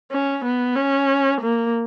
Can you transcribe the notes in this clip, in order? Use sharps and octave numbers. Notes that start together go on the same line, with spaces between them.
C#4
B3
C#4
A#3